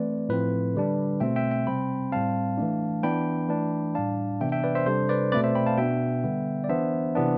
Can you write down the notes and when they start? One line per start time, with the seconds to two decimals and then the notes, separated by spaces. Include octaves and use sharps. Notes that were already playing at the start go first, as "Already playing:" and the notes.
Already playing: E3 A3 C4 B4 D5
0.29 A2 F3 C4 B4
0.75 D3 G3 D4
1.20 B2 A3 C4 E5 G5
1.36 E5 G5
1.51 E5 G5
1.67 C3 G3 C4 G5 B5
2.12 A2 G3 C4 F5 A5
2.58 E3 A3 D4
3.03 E3 B3 D4 G5 B5
3.49 E3 A3 D4
3.95 A2 G3 D4 F5 A5
4.41 C3 E3 B3 D4 E5 G5
4.52 E5 G5
4.63 B4 D5
4.75 C5 E5
4.86 C3 G3 D4 A4 C5
5.09 B4 D5
5.32 B2 A3 C4 B4 D5
5.44 C5 E5
5.55 G5 B5
5.66 F5 A5
5.78 B2 B3 D4 E5 G5
6.24 D3 G3 B3
6.64 D5
6.69 E3 B3 D4 C5 E5
7.15 C3 E3 B3 D4